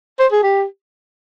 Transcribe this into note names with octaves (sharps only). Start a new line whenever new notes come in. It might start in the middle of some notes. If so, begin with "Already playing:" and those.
C5
G#4
G4